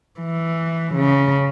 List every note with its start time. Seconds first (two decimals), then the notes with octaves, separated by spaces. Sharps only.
0.20 E3
0.95 C#3